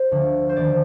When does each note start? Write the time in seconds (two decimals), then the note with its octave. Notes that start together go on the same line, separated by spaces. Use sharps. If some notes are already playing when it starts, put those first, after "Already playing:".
Already playing: C5
0.11 D2 D3 F3
0.49 C5
0.56 D#2 D#3 D5